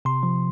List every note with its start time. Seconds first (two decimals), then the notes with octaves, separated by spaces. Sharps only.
0.05 C3 C6
0.23 F3